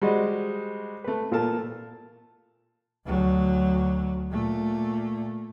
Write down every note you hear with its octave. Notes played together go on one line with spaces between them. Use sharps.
G3 G#3 F#4 C5 D#5
A3 B4
A#2 F4 A4 A#4 A5
D2 F#3
A#2 A3